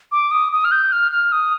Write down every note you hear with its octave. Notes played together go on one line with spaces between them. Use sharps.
D6
D#6
D#6
F6
G6
F6
F6
D#6